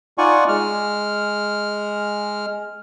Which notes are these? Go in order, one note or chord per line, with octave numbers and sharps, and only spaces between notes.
D#4 F4 D5 F#5 G#5 C#6
G#3 F6